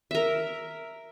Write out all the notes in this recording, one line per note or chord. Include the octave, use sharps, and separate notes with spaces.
A#4 E5